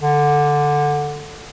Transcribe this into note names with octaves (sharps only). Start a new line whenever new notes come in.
D3